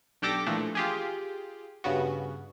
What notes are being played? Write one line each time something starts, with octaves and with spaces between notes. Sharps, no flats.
B1 D4 G4 A4 D6 A#6
A#2 E3 F3 A3 D4
F4 G4 G#4
G2 C#3 B3 F#4